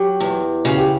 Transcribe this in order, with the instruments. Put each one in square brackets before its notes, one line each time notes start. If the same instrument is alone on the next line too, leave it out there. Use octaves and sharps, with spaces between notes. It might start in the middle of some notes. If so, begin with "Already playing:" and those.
Already playing: [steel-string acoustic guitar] F#3 [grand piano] G4
[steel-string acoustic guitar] E2
[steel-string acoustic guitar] C#3 [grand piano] F#4
[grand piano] G4